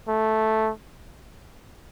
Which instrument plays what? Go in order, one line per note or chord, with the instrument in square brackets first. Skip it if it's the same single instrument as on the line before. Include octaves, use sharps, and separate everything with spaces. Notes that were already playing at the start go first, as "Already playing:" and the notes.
[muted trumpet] A3